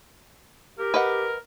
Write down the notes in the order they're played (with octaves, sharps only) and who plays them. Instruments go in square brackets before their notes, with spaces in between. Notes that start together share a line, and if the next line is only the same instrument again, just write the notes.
[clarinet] G4 [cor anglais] A#4
[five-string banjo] B4 D#5 F#5